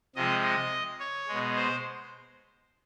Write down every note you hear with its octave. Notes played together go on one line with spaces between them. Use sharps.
C3 F3 G#3 D#5
D#5
C#5
B2 G#3
C5